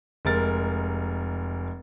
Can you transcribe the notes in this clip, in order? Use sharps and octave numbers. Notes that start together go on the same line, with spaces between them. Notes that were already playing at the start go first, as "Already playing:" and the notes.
F1 G#3 A#4 A6